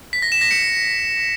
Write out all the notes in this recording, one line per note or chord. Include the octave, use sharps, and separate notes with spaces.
B6
A#6
E7
A#6
C#7